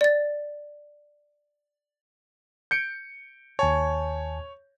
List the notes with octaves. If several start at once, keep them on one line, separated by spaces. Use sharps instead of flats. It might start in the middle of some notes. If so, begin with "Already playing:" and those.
D5 A6
G6 C#7 D7
D#2 C#5 G#5 A5